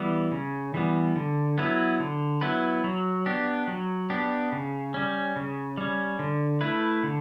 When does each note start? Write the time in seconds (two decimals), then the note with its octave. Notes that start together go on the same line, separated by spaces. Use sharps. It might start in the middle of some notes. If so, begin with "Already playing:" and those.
Already playing: E3 G3 B3
0.32 C#3
0.74 E3 G3 B3
1.16 D3
1.58 F#3 B3 E4 B4
2.00 D3
2.41 F#3 B3 E4 B4
2.84 F#3
3.26 B3 D4 G4
3.67 F#3
4.10 B3 D4 G4
4.52 C#3
4.94 G3 C#4
5.36 C#3
5.77 G3 C#4
6.19 D3
6.61 A3 E4 B4
7.03 D3